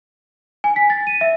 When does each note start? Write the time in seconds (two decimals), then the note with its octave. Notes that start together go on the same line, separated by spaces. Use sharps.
0.64 G#5
0.76 B6
0.90 A6
1.07 D#7
1.21 E5